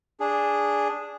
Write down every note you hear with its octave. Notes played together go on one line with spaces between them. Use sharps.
D4 G#4